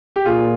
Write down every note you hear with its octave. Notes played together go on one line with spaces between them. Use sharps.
G4
A#2 F4 G#4